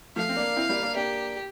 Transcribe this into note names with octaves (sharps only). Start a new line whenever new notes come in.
F3 A3 F5
C4
A#3 D4
C4 E4
G3 A#3
A#3 D4
A#3 D4 G4